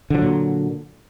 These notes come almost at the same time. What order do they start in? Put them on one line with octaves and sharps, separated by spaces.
D3 F3 F#3 A#2